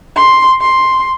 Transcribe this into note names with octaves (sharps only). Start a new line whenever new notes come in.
C6
C6